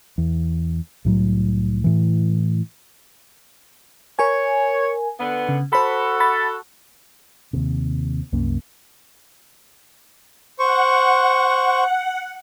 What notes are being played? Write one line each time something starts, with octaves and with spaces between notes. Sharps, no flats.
E2
C2 A2 F#3
A2 E3
A#4 C#5 G#5
D3 B3
C#3
F#4 A4 C5 B5
B5 A6
D#2 C3
C2 F#2 A#3 C#4
C5 F#5 C#6